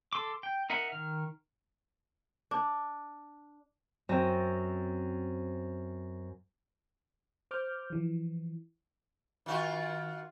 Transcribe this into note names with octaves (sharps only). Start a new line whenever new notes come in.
A4 C6 D6
G5
D#4 A#4 E5 F#5
D#3 F6
D4
F#2 C4 A#6
C5 D6 F6 G6
E3 F3
D#3 F4 F#4